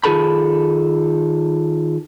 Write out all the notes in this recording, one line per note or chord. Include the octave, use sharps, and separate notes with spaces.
D#3 F4 G#4 A4 A5 B5